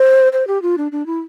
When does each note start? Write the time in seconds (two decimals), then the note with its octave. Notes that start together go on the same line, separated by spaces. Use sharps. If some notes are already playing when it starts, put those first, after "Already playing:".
Already playing: C5
0.33 C5
0.47 G4
0.62 F4
0.78 D4
0.92 D4
1.06 E4